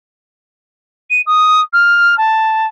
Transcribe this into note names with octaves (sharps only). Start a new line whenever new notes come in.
D#7
D#6
F6
A5